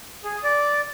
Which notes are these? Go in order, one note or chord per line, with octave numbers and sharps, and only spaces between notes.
G#4
D5